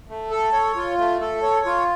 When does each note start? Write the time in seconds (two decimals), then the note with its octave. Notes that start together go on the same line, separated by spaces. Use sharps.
0.09 A3
0.31 A4
0.53 C#5
0.76 F4
0.98 A3
1.21 A4
1.43 C#5
1.66 F4